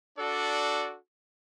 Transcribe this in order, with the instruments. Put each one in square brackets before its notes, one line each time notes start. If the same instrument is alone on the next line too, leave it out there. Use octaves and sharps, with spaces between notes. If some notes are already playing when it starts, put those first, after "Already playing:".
[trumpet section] D4 F#4 A4 D5